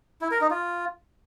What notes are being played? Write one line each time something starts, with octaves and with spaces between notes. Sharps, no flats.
E4
A#4
D#4
F4